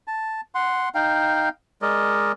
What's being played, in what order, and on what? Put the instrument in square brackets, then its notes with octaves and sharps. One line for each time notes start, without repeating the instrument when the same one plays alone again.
[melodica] A5
F#5 C6
D#4 F5 G5
G#3 A#4 D5 D#5